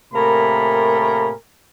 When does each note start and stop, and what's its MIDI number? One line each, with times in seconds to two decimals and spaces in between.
0.14 1.32 45
0.14 1.32 48
0.14 1.32 58
0.14 1.32 70
0.14 1.32 80
0.14 1.32 83